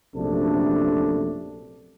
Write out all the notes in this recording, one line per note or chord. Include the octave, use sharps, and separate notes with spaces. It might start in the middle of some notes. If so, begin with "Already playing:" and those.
A#1 F#2 C3 A3 D4 A4